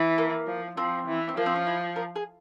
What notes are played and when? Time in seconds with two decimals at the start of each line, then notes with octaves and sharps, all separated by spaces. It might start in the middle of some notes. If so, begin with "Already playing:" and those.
Already playing: E3
0.18 A#3
0.47 F3
0.77 F3 C4
1.07 E3
1.29 C4
1.37 F3 A#3
1.46 C4
1.56 C#4
1.67 E4
1.96 A#4
2.16 G#4